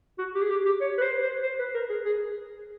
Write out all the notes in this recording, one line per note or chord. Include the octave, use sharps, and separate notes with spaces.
F#4
G4
G#4
G4
G4
C#5
B4
C5
C5
C5
B4
A#4
G#4
G#4